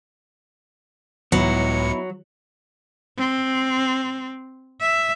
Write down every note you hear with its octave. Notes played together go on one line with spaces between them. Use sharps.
C#2 A2 F#3 B3 D#4 E4 C#7
C4
E5